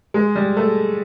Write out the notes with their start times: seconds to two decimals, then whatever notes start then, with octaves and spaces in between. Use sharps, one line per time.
0.14 G#3
0.36 G3
0.57 A3